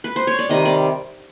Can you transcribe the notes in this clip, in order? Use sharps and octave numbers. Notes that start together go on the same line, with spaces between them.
B4
C5
C#5
D5
C3 D#3 G3 D#5
D5